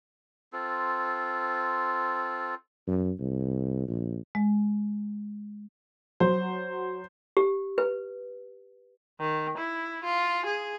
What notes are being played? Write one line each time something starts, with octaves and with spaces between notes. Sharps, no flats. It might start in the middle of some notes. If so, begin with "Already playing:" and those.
C4 F4 A4
F#2
C2
A#1
G#3
F#3 C5
G4
B4
D#3
E4
F4
G#4